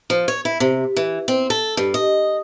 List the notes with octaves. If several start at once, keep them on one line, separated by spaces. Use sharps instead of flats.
F3
C#5
E4
C3
E3
C4
A4
G2
D#5